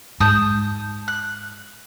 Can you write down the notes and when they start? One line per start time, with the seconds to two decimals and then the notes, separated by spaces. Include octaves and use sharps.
0.20 G#2 A5 D#6 G6
1.08 F#6